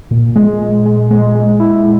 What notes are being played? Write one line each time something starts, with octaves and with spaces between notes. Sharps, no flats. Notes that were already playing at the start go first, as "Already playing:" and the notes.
A#2
G#3
G#3
G#3
G#3
G#3
E4